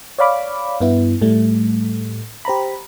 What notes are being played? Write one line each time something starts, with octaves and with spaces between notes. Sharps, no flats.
C#5 D5 F5 B5 D6
G2 B3 E4
A2 G3 A3
G4 C5 A#5 B5